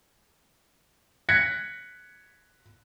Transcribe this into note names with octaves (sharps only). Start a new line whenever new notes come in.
F#6 G#6 A#6 B6 C#7